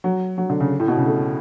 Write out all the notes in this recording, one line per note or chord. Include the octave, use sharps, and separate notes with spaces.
F#3
F#3
D3
C#3
A2
B2
C#3
A3